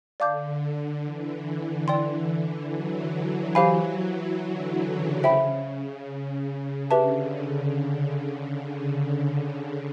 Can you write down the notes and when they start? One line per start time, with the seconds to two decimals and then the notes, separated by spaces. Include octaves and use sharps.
0.20 D3 D5 F5 A5 D6 G6
1.04 D3 E3
1.88 D5 G5 C6
2.71 E3 F#3
3.13 E3 F#3
3.55 E3 F#3 G4 C5 F5 G#5 B5
4.39 D3 E3
4.81 C#3
5.23 C5 E5 G5 B5
6.90 D3 G4 B4 E5 A5